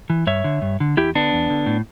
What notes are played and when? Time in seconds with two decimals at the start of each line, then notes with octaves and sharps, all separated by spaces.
0.10 E3
0.27 G2 C#5 E5
0.44 D3
0.62 G2
0.80 D3
0.97 E2 E4 G4
1.15 D3 B3 D4
1.33 E2
1.50 D3
1.66 A2